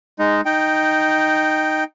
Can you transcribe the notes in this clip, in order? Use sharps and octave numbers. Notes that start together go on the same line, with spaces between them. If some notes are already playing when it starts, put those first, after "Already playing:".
G#3 D#4
D#4 G5